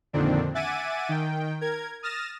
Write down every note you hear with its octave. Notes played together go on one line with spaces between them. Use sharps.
F2 A#2 D3 D#3 C4 D4
E5 F#5 G#5 D6 A6 D#7
D#3 G5
A#4 G#6
D#6 F6 A6 A#6 E7